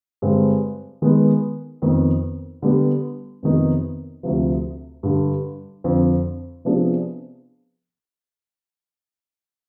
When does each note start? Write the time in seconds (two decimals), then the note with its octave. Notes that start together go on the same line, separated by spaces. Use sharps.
0.22 G2 D3 G#3 C4
1.02 D#3 G#3 B3
1.82 F2 D#3 B3
2.62 D3 G3 B3
3.43 F2 C3 D#3 B3 D#4
4.23 D2 C3 F3
5.03 G2 D3 G3
5.84 F2 D3 F3
6.65 C3 F3 B3 D4 G#4